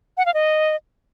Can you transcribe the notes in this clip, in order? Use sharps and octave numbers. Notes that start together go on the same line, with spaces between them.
F#5
F5
D#5